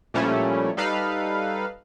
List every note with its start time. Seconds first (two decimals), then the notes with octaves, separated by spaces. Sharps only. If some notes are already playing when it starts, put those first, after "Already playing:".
0.14 A#2 F3 G3 A3 C#4 E4
0.77 G3 D#4 A4 B4 F5